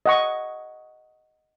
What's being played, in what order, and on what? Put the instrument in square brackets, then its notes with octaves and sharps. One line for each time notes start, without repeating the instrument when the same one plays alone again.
[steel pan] D#5 F#5 C#6